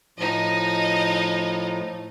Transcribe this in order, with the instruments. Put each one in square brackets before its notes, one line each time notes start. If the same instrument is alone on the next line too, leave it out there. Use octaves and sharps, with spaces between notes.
[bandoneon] A2 F3 [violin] D#4 D#5